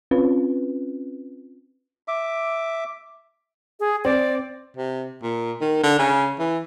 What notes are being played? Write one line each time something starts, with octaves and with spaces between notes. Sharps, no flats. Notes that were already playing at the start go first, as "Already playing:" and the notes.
C4 C#4 F4 B4
E5 D6
G#4
C4 D5
C3
A#2
D#3
D3
C#3
E3